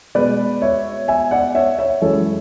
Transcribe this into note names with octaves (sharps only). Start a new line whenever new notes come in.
B2 G#3 B4 D5
C#5 E5
E5 G#5
D5 F#5
C#5 E5
C#5 E5
F#2 E3 G#3 A4 C#5